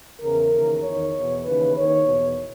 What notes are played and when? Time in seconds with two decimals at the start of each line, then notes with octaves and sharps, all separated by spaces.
0.21 E2 C#3 E3 A#4
0.52 D#2 C#3 E3
0.83 E2 D#3 C#5
1.14 E2 B2
1.45 D#2 C#3 E3 B4
1.77 D#2 D#3 C#5
2.06 E2 B2